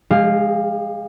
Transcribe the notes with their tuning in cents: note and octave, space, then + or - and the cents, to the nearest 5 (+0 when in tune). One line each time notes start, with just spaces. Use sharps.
G#3 +0 G4 +45 F5 +0